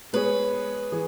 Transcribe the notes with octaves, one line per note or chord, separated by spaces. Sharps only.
G#3 B3 G#4 B4 C#5
E3 G#4